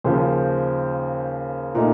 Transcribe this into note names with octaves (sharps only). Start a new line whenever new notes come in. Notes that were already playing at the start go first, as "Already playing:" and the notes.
D#2 C#3 F3 C5
A#2 A3 D#4 A#4